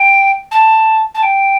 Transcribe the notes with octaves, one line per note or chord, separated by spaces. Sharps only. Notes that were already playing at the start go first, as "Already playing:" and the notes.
Already playing: G5
A5
A5
G5